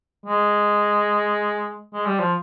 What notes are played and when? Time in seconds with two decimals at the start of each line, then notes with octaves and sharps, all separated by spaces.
0.26 G#3
1.94 G#3
2.06 G3
2.20 F3